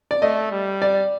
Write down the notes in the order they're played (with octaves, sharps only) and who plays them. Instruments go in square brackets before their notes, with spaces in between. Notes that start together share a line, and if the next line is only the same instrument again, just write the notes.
[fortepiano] D5
[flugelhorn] A3 [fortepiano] D#5
[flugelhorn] G3
[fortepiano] D5